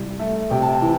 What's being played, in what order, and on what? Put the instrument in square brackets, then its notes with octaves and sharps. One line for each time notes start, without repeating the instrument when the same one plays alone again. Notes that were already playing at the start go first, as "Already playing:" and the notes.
Already playing: [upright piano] C2
A3
[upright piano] C3 [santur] G5
[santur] A5
G5
[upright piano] E3